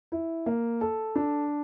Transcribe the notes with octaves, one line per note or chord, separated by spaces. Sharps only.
E4
A#3
A4
D4